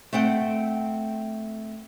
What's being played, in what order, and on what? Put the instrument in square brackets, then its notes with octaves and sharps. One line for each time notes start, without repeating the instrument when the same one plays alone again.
[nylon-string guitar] A3 C4 F#5 G5